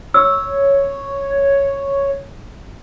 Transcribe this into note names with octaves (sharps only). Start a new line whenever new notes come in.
C#5 E6